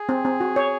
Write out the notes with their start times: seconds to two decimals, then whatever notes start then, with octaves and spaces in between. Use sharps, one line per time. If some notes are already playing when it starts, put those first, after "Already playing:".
Already playing: G#4
0.09 C4
0.25 C4
0.40 F#4
0.56 C#5